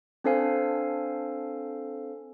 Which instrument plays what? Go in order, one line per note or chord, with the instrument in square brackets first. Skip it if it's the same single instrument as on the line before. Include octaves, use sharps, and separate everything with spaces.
[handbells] C4 D4 A4 C5 F5 G#5